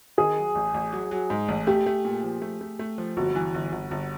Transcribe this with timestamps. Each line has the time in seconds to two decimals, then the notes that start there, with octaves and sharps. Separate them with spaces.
0.18 D#3 G#4
0.37 F#3
0.55 A1
0.74 A1
0.93 F#3
1.11 F#3
1.30 G#2
1.48 A1
1.67 A3 G4
1.86 A3
2.05 A#2
2.23 F3
2.42 A3
2.61 A3
2.79 A3
2.98 F3
3.17 G1 F#4
3.35 E3
3.54 G1
3.72 G1
3.91 G1